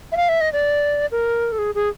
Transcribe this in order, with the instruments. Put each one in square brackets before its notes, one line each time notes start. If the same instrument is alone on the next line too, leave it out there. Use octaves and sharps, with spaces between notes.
[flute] E5
F5
E5
D#5
D5
A#4
A4
G#4
G#4